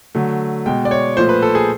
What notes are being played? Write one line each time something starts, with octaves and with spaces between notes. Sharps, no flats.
D3 F#3 A3
B2 G#3 G5
D5
C#5
A#2 F3 A3 C5
B4
A4
G#4